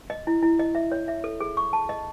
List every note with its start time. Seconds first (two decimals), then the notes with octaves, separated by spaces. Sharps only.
0.10 D#5
0.27 E4
0.43 E4
0.59 D#5
0.75 E5
0.92 C#5
1.08 E5
1.24 A4
1.41 G#4
1.57 C#6
1.73 A5
1.89 D#5